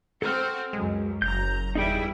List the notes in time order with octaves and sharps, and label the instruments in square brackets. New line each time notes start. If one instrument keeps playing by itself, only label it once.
[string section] C4 F#4 [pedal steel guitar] A4 F6
[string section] C#2 F#2 [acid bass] G#3
[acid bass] F#1 [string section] F#2 A#5 [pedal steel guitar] G6
[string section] E2 G3 E4 [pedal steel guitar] D#4 G#4 G5